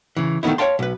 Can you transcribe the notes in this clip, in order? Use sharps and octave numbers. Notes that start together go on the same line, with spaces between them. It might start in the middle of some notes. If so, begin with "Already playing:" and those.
C#3 E3
D#3 A3 B3 D#4 E4
C#5 E5 F5 G5 A5 C6
B1 B4